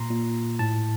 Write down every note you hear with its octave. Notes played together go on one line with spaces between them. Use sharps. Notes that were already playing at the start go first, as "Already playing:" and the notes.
Already playing: A#2 A#5 C6
A#2
A2 A5